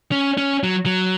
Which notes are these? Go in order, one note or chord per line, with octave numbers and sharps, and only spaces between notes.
C#4
C#4
F#3
F#3